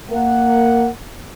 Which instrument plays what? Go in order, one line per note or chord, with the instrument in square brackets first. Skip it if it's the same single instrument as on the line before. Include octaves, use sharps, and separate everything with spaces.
[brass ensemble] A#3 F#5